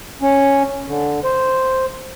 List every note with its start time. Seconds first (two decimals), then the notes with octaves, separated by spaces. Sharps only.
0.22 C#4
0.89 D3
1.24 C5